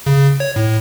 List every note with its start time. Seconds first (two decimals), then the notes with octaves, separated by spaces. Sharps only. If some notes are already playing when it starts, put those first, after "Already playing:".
0.06 C#3
0.40 C#5
0.56 A2